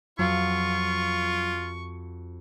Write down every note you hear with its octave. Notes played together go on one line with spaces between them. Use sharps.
F2 F#3 F4 F#4 F5 C#6